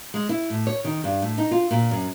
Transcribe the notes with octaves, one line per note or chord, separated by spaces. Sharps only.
G#3
E4
A2
C#5
D#3
G2
A2
D#4
F4
A#2
F#2